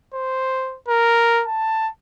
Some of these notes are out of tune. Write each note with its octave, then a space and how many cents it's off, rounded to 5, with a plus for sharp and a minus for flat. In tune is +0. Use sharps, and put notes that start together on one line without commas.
C5 +0
A#4 +0
A5 +10